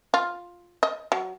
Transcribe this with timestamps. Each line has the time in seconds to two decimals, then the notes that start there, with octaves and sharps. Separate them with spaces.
0.14 F4
0.83 D#5
1.12 F#3